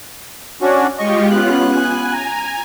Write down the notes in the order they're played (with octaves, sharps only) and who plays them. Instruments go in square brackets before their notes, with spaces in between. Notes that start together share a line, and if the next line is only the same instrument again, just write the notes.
[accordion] C#4 D4 F#4
[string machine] G#3 F4 G4 [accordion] D#5 C#6
[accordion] B3 F#6 [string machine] C#4 F4
[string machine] G#5
[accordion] A#5